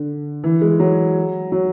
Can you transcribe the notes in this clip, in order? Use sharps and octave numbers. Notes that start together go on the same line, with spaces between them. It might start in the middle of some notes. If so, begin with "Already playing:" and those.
Already playing: D3
E3
G#3
F#3
F#3